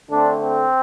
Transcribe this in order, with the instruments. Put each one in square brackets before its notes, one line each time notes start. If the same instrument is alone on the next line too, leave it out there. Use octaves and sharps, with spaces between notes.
[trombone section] D3 A3 C4 D4
C4